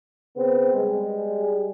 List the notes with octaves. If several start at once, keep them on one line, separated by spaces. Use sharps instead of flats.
C#3 B3 C4
G3 G#3